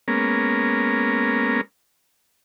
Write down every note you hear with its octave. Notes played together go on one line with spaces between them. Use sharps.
G#3 A#3 B3 C#4 A#4